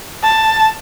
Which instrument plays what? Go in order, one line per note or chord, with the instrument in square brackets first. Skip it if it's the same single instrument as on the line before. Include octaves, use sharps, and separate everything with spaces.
[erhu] A5